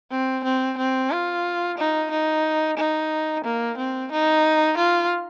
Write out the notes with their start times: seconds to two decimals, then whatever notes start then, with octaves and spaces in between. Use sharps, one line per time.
0.11 C4
0.44 C4
0.78 C4
1.11 F4
1.78 D#4
2.11 D#4
2.77 D#4
3.44 A#3
3.77 C4
4.12 D#4
4.78 F4